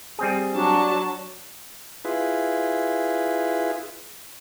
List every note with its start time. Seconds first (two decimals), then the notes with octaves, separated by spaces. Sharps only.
0.19 G3 C4 G#4
0.55 F#3 D4 A5
2.05 E4 F4 G#4 B4